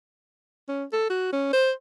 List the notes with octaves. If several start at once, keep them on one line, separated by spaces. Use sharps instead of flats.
C#4
A4
F#4
C#4
C5